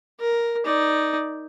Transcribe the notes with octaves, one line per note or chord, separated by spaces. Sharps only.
A#4
D#4 D5